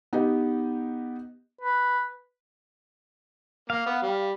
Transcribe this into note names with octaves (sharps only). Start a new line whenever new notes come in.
B3 D#4 G4 D#5
B4
A#3 F5
B3
G3